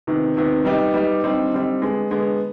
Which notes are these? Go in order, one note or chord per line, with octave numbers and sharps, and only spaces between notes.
C3 D#3 B3
C3 D#3 B3
G3 B3 D#4 G4
G3 B3 D#4 G4
D3 G3 C4 D#4
D3 G3 C4 D#4
D3 G#3 B3
D3 G#3 B3